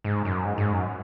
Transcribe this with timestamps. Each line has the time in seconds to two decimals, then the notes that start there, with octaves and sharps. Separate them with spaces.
0.04 G#2
0.25 F#2
0.45 G#2
0.58 G#2
0.73 F#2